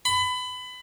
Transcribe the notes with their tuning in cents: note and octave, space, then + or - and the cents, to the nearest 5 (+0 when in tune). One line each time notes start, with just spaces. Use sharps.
B5 +25